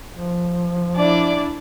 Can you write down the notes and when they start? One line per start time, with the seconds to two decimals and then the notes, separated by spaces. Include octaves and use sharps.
0.12 F3
0.96 D4 E4 D5